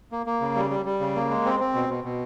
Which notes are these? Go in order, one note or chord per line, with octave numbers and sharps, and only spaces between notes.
A#3
A#3
C#3
G3
G3
G3
C#3
A#3
G#3
C4
C4
B2
B2
B2